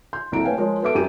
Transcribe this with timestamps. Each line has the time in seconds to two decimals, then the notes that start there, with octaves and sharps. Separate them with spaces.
0.13 C6 G6
0.32 F#1 C2 A4 A#5 D7
0.44 A3 B4 C#5 F5 G5 G#5
0.57 F3 G#3 A#4 C#5
0.82 B3 F#4 A4 E5 D6 D7
0.95 F#2 G4 D#7